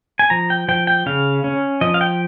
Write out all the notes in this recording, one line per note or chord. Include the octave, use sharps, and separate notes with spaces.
G#5
F3 A#5
G5
F3 G5
G5
C#3 F5
C#4
F3 D#5
F5
G5